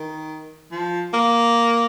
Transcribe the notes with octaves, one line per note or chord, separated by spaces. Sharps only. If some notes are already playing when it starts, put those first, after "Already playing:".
Already playing: D#3
F3
A#3